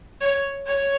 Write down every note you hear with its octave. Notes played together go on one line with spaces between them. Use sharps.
C#5
C#5